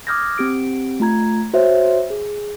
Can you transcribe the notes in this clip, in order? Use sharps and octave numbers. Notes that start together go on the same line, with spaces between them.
D6 D#6 F6 G6 G#6 A#6
C4 G4 D7
A3 F4 A#5 G#6
F#4 C5 C#5 E5
G#4